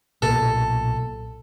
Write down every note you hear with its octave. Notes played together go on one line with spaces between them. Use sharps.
B1 A#2 A4